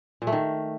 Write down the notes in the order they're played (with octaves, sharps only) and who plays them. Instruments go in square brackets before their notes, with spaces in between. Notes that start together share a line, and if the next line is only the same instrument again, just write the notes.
[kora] A#2
A3
D#3